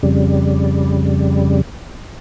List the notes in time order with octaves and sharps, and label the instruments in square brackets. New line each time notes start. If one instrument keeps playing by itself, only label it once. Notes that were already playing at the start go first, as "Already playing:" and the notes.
[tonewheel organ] F2 C#3 G3